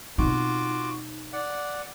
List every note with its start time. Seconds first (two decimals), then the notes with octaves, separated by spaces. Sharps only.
0.18 B2 C4 D#4 F4 F#4 D6
1.33 D5 F#5